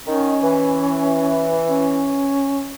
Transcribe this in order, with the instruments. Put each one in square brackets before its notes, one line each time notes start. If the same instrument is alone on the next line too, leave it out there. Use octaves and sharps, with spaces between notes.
[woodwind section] D#3 [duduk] C#4
[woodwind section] E3
[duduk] C#4